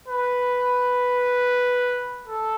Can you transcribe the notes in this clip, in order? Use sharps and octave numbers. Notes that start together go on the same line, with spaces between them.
B4
A4